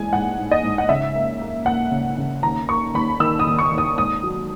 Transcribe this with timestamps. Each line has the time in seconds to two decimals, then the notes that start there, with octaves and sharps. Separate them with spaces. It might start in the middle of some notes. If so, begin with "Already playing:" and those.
Already playing: E3 G#3 G#5
0.13 G#2 F#5
0.38 G#2
0.51 D#5
0.63 G#2
0.78 F#5
0.89 C#3 E5
1.15 A#3
1.41 A#3
1.66 A#3 F#5
1.91 C#3
2.18 C#3
2.43 D#2 A#5
2.69 A#3 C#6
2.94 D#2 B5
3.20 D#3 E6
3.39 D#6
3.47 D#2
3.59 C#6
3.72 D#2
3.78 D#6
3.98 G#2 D#6
4.23 F#3